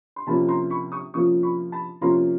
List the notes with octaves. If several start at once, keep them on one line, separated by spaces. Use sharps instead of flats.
C6
C3 F3 A#3 C#4 F4 A5 B5
A#5 C6
B5 C#6
C#6 D#6
C3 F3 A#3 C#4 F4 C#6 D#6
B5 C#6
A5 B5
C3 F3 A#3 C#4 F4 A#5 C6